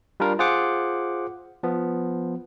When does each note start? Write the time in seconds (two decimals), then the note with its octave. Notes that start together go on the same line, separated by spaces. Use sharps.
0.20 G3 D4 F4 A#4
0.39 F4 G#4 C5 F#5 D6
1.63 F3 B3